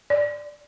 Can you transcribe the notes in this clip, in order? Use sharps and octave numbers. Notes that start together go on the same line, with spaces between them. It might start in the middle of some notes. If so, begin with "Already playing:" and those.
D5